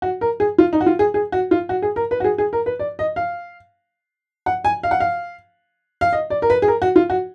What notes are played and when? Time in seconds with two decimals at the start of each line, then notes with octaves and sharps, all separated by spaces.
0.02 F#4
0.21 A#4
0.40 G#4
0.58 F4
0.73 D#4
0.81 F#4
0.86 F4
0.99 G#4
1.14 G#4
1.32 F#4
1.51 F4
1.69 F#4
1.82 G#4
1.96 A#4
2.11 B4
2.20 F#4
2.24 G#4
2.38 G#4
2.53 A#4
2.66 B4
2.79 D5
2.99 D#5
3.16 F5
4.46 F#5
4.65 G#5
4.83 F5
4.91 F#5
5.00 F5
6.01 F5
6.13 D#5
6.30 D5
6.42 A#4
6.50 B4
6.62 G#4
6.68 A#4
6.82 F#4
6.96 F4
7.10 F#4